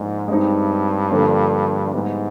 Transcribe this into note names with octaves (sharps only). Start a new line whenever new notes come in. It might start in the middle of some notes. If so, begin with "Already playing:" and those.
Already playing: G#2 F3 A#3 D4
G2 G#3 C4 D#4
D3 F3 A#3 D4
G#2 G3 B3 E4